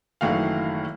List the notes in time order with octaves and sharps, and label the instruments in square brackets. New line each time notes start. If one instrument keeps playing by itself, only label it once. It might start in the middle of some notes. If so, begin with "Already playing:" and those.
[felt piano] F#1 D#3 E3 A3 F#4 F5